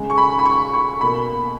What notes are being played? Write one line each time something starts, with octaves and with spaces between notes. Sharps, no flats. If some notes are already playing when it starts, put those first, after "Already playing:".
Already playing: C#3 G#3
C#6
B5
B5
C#6
C#6
B2 A#3 B5